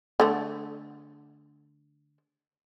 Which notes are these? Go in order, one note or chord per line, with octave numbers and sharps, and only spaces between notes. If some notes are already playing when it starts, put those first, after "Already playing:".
D3 A3